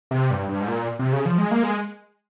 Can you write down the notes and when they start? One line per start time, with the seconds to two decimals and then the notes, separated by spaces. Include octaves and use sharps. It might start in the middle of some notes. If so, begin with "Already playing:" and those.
0.11 C3
0.31 G2
0.49 G2
0.61 G#2
0.68 A#2
0.99 C3
1.13 C#3
1.25 F3
1.38 G#3
1.51 A#3
1.63 G#3